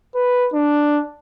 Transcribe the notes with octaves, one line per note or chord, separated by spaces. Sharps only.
B4
D4